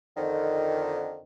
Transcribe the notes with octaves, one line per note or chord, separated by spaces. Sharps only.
F2 D3 D#3